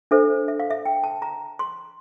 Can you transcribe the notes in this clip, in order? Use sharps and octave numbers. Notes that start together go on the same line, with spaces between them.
D4 A4 C5 E5
E5
F5
E5
G5
A5
A#5
C6